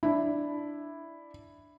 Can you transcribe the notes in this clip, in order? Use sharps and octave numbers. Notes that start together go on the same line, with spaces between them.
D4 E4